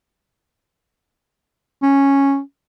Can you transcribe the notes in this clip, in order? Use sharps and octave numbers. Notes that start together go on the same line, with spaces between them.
C#4